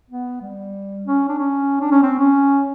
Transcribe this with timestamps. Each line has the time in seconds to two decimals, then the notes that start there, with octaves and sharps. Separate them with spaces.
0.10 B3
0.42 G3
1.06 C#4
1.29 D4
1.39 C#4
1.81 D4
1.92 C#4
2.03 C4
2.20 C#4